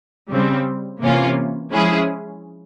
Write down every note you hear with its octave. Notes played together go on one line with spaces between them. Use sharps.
C#3 G3 C4
C3 E3 A#3 C#4 F4
F3 G#3 C#4 E4 G#4